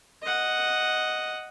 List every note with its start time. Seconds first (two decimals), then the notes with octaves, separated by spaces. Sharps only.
0.22 D#5 F#5